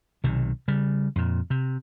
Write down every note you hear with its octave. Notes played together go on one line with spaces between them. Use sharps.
B1 C3 D#3
C#3 G3
F2 A#2
C3